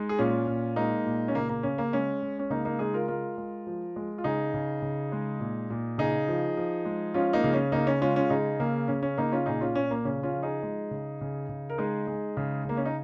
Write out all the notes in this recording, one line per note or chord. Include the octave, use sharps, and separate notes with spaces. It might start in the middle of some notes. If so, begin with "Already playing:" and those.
Already playing: G#3 D#4
G#4
A#2 C#4 F4
A#2
G#3 A#3 D#4
A#2
C#4
C#3 A#3
A#3
C#3 C#4
A#3
G#3 C#4
G#3
C#4
C#3 A#3 D#4
A#3 D#4
G#3 D#4 G#4
F4 A#4
G#3 F4 A#4
G#3
F3
G#3
F4
C#3 D#4 G#4
C#3
C#3
G#3
A#2
A#2
C#3 D#4 G#4
F3
F3
G#3
F3 C#4 F4
A#3 D#4
C#3
C#4
C#3 A#3 D#4
C#4
G#3 C#4 F4
C#4 F4
C#3 D#4 G#4
C#3 A#3
C#3 C#4
C#4
C#3 A#3 D#4
C#4 F4
A#2 D#4 G#4
C#4 F4
A#2 C#4
A#3
C#3 C#4
C#4 F4
F3
D#4 G#4
G#3
C#3
C#3
C#3
A#4
G#3 D#4 G#4
G#3
C#3
C#3 A#3
C#4
D#4